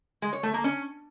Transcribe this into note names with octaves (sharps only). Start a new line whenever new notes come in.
G#3
C#5
A3
A#3
C#4